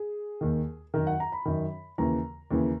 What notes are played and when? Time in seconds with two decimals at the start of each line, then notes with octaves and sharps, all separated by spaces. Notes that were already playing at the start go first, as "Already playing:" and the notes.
Already playing: G#4
0.41 D#2 D#3
0.94 F#2 D#3 A#4
1.07 F#5
1.20 A#5
1.32 B5
1.45 F#2 D#3
1.98 D#2 C#3 E3 A#5
2.51 D#2 C#3 E3